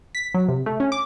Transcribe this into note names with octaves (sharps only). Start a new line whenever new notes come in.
B6
F#3
C3
A3
C#4
D6